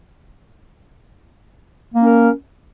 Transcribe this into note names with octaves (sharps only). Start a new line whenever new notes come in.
A#3 C#4 A#4